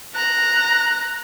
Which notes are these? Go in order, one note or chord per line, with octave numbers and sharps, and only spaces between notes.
A#5 F#6